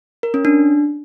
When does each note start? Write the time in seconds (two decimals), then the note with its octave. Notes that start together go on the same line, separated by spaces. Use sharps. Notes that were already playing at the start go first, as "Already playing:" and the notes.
0.23 A#4
0.34 C#4
0.45 D4